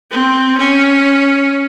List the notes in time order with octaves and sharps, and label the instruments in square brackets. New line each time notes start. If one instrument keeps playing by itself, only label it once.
[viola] C4
C#4